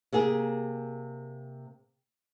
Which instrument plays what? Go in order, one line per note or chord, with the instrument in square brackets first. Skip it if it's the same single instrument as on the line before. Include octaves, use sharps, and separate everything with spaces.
[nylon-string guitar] C3 A#3 G#4